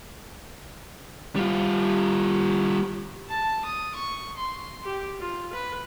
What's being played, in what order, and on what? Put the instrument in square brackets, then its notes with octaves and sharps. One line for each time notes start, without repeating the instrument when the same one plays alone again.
[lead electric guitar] G3 F4
[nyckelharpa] A5
D#6
C#6
C6
G4
F4
B4